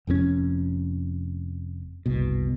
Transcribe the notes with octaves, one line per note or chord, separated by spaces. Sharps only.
F1 F2 B2 C#4
F#1 C2 B2